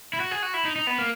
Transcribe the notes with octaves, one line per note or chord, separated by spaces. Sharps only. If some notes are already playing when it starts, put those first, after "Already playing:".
E4
F#4
G#4
F#4
E4
D#4
D#4
B3
A#3